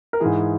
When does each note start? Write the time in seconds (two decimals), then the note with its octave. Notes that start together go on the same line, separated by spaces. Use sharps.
0.13 A#4
0.20 G#2 E3 G#4